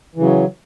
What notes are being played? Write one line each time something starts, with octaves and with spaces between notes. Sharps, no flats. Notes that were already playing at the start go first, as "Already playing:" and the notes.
C#3 E3 F#3